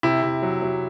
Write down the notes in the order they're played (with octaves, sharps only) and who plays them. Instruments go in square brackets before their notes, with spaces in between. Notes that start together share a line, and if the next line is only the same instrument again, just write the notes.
[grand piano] C3 E4
C3
F#3
F#3